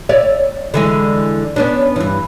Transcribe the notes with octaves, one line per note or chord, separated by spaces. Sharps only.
C#5 D5 E5
D3 E3 G#3
B3 C#4 D4
G2 E3